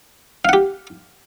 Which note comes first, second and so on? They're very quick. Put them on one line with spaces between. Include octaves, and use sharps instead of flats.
F5 F#5 G4